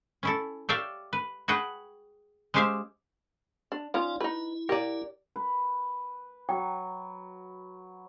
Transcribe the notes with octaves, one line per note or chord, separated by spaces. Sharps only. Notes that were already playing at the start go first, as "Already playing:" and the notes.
C#4 E4 A4
G4 C#5 D5 E5 F5 G5
B4
F#4 G#4 B4 F#5 G5
G#3 C#4 G4 C5 E5 F5
D4
F3 C#4 D#4 F4 D5
D#4 E4 B4
G4 A#4 D5
B4
F#3 G5